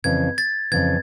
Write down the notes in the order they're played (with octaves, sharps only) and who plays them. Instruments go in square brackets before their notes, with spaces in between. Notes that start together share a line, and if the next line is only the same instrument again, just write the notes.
[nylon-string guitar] F2 C#3 E3 [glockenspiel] G#6
[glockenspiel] A6
[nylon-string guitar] F2 C#3 E3 [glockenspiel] G#6